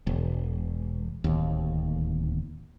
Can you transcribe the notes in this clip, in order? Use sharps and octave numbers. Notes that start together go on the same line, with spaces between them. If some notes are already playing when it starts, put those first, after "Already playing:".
E1
D1 D#2